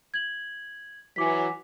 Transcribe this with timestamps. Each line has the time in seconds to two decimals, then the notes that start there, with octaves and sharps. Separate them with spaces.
0.14 G#6 F#7
1.16 E3 F#3 G#5 D6 B6